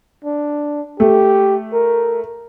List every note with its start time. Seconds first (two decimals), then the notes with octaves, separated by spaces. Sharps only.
0.25 D4
1.00 A3 G4
1.74 A#4